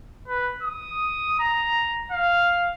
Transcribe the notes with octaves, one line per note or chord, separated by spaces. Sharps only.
B4
D#6
A#5
F5